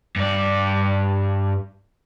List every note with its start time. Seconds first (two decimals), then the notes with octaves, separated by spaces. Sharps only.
0.16 G2 D5